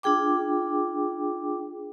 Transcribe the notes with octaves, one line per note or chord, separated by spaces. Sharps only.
D4 F4 G#4 G5 D6